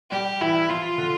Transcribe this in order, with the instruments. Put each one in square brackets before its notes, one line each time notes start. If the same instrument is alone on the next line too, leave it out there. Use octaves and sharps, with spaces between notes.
[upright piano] G3 [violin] G4
[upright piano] E3 [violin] E4
[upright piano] F3 [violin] F4
[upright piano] D3